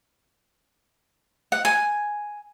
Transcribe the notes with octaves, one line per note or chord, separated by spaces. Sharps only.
F#5
G#5